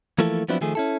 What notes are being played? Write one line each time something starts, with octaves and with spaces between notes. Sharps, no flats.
E3 F3 A3 A#3 E4 A4
F3 F#3 B3 C4 D4 E4
D#3 F3 A3 G#4
C#4 E4 A4